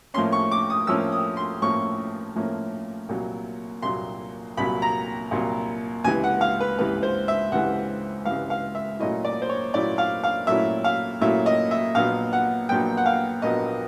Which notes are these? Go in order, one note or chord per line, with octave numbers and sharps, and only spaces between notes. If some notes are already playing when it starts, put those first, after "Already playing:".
A2 F3 A#3 C#4 C6
C#6
D6
D#6
A2 F3 A#3 C#4 E6
D#6
C6
A2 F3 A#3 C#4 C#6
A2 F3 A#3 C#4
C2 A#2 F#3
C2 A#2 F#3 C6
C2 A#2 F#3 B5
A#5
C2 A#2 F#3
C#2 C3 E3 G#5
F#5
F5
B4
C#2 C3 E3 B4
C5
E5
C#2 C3 E3 F#5
C#2 C3 E3 F5
F5
E5
A#2 F#3 A3 C#4 E4 D#5
D5
C5
C#5
A#2 F#3 A3 C#4 E4 D5
F5
F5
A#2 F#3 A3 C#4 E4 E5
F5
A#2 F#3 A3 C#4 E4 E5
D#5
E5
A#1 A#2 F#3 B3 F5
F#5
A#1 A#2 F#3 B3 G5
F#5
F5
A#1 A#2 F#3 B3 D#5